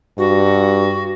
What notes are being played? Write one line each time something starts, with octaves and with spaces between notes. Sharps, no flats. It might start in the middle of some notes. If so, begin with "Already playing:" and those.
G2 F#4